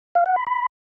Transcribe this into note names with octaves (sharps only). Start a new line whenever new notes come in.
F5
F#5
B5
B5